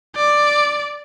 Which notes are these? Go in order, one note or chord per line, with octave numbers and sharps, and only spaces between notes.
D5